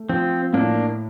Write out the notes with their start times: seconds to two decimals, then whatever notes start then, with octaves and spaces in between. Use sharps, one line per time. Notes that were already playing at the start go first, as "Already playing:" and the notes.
Already playing: A3
0.09 F3 C4
0.53 A2 A#3 D4